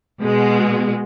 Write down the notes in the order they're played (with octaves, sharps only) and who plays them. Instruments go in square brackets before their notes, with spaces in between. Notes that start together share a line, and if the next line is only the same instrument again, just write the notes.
[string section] B2 G#3